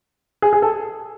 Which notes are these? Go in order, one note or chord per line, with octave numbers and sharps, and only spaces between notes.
G#4
G#4
A4